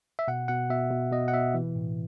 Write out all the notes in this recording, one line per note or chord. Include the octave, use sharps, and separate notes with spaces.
E5
B2 F#5
B2 F#5
B2 E5
B2
B2 D#5
F#5
B2 E5
E3
A2